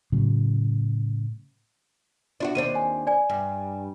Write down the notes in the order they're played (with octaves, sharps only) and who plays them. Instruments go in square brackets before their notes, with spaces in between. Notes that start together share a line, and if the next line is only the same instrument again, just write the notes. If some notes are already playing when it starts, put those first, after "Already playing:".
[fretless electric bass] A2 C#3 F#3
[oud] D4 F4 F#4
[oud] D#2 C4 D4 [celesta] D#7
[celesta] G#5
D5 G#5
[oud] G2